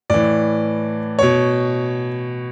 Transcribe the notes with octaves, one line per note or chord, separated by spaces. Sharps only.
A2 E3 D5
C#5
B2